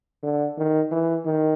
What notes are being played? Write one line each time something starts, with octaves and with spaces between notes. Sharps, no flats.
D3
D#3
E3
D#3